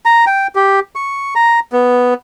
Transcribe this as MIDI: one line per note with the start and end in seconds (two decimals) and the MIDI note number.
0.06 0.25 82
0.27 0.47 79
0.55 0.80 67
0.95 1.34 85
1.35 1.60 82
1.72 2.14 59